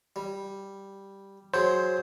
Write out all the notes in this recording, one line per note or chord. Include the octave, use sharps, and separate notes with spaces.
G3
F#3 G#4 C5